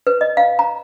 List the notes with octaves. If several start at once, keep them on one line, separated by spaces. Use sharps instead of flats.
B4
D#5
F5
A#5